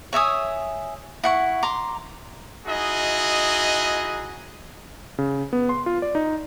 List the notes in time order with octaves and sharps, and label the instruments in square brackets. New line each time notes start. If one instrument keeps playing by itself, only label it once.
[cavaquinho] C#5 E5 G#5 D#6
E4 F#5 C#6
A#5 C6 D6
[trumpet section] D#4 E4 F#4 G#4 D#5
[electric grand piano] C#3
B3
C6
F4
D5
D#4